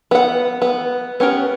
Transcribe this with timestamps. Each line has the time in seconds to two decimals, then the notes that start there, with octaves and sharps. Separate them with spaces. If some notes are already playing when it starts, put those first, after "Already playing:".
0.11 B3 F#5
0.62 B3
1.20 B3 C#4 G4 A#4